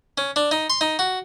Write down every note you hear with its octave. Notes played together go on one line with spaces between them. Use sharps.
C#4
D4
D#4
C6
D#4
F#4